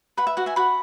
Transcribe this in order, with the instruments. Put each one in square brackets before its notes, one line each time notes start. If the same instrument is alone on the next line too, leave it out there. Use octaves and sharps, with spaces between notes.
[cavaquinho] B4 F#5 B5
E5
F#4 F#5
E5 G#5
F#4 F#5 B5